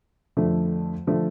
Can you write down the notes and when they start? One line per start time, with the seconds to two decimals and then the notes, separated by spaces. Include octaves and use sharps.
0.37 F2 D3 F3 A3
1.07 D3 F3 A3